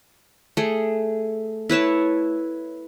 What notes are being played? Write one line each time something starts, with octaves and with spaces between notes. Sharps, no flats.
A3 G#4
E4 B4 C#5 A5